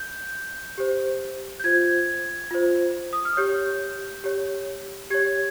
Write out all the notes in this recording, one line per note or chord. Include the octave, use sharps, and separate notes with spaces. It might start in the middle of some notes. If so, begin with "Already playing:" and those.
Already playing: G6
G4 C5
G6
F4 C5 G#6
F4 C5
D#6
F6
G4 C#5 G6
G4 C#5
G4 C#5 G#6